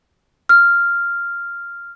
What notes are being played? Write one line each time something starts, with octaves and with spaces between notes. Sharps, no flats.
F6